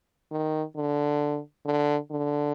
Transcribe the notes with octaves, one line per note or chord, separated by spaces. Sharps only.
D#3
D3
D3
D3